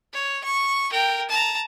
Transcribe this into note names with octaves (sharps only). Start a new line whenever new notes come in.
C#5
C#6
A#4 G5
A5 A#5